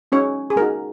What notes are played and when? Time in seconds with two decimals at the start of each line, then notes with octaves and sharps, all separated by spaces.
0.12 G#3 C#4 D#4 F#4 C#5
0.50 G#4
0.56 G#3 D#4 F#4 A#4